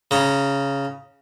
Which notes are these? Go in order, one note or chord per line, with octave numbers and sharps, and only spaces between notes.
C#3 A#5